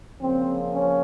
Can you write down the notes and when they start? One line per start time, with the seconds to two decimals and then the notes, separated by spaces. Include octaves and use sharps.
0.20 C#3 F3 A#3 C4
0.72 C#4